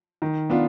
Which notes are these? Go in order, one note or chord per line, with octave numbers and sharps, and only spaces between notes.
D#3
B3 D4 F4